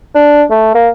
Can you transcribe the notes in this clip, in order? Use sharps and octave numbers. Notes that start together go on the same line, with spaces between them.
D4
A3
A#3